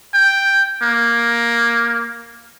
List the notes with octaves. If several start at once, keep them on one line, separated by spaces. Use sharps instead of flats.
G5
A#3